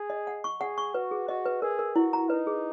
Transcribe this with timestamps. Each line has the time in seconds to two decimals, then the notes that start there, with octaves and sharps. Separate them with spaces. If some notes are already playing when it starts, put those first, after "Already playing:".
Already playing: G#4
0.10 D#5
0.27 F#5
0.44 C#6
0.61 G#4 F#5
0.78 C#6
0.94 F#4 B4
1.11 G#4
1.28 F#4 D#5
1.46 B4
1.62 G#4 A#4
1.79 A#4
1.96 E4 F#4
2.13 A#5
2.29 D#4 B4
2.47 G#4